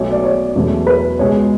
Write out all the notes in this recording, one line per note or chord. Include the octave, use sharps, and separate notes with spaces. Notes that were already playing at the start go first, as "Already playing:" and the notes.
Already playing: B1 B2 A3 C#5
D5
C#5
E2 B2 F#3 A3
B4
C#2 B2 G#3 C#5